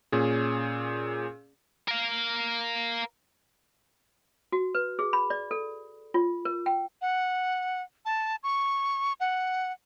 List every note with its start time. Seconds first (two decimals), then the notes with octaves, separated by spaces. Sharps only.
0.12 A#2 C#4 G#4
1.88 A#4 F5
4.52 F#4
4.75 B4
4.99 G#4
5.13 B5
5.30 D5
5.51 A4
6.14 F4
6.45 A#4
6.66 G5
7.01 F#5
8.05 A5
8.43 C#6
9.20 F#5